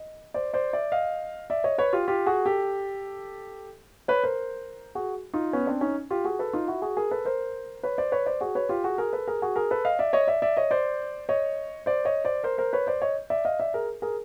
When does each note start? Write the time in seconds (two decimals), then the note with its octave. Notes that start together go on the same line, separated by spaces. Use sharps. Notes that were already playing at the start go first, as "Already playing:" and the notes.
Already playing: D#5
0.34 C5 D5
0.54 C5 D5
0.73 D5 E5
0.92 D#5 F5
1.50 D5 E5
1.64 C#5 D#5
1.78 B4 C#5
1.93 F4 G4
2.08 F4 G4
2.26 F#4 G#4
2.46 G4 A4
4.08 B4 C#5
4.24 A#4 C5
4.95 F#4 G#4
5.34 D#4 F4
5.53 B3 C#4
5.67 C4 D4
5.81 C#4 D#4
6.11 F4 G4
6.25 F#4 G#4
6.39 A4 B4
6.53 D#4 F4
6.68 E4 F#4
6.82 F#4 G#4
6.97 G#4 A#4
7.11 A4 B4
7.25 A#4 C5
7.83 B4 C#5
7.98 C5 D5
8.12 B4 C#5
8.26 C5 D5
8.41 F#4 G#4
8.55 B4 C#5
8.69 F4 G4
8.84 F#4 G#4
8.98 G#4 A#4
9.13 A4 B4
9.28 G#4 A#4
9.42 F#4 G#4
9.56 G#4 A#4
9.71 A4 B4
9.85 D#5 F5
9.99 D5 E5
10.13 C#5 D#5
10.28 D5 E5
10.42 D5 E5
10.57 C#5 D#5
10.71 C5 D5
11.29 C#5 D#5
11.86 C5 D5
12.05 C#5 D#5
12.25 C5 D5
12.44 A#4 C5
12.58 A#4 C5
12.73 B4 C#5
12.87 C5 D5
13.02 C#5 D#5
13.30 D5 E5
13.45 D#5 F5
13.60 D5 E5
13.74 G#4 A#4
14.02 G#4 A#4